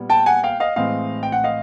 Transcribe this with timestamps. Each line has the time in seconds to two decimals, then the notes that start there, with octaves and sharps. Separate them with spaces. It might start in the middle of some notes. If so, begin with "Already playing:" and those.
Already playing: A#2 G3 B3
0.10 G5 A5
0.26 F#5 G#5
0.43 F5 G5
0.60 D#5 F5
0.76 A2 E3 G#3 C4 D#5 F5
1.23 G5
1.32 F#5
1.44 D#5 F5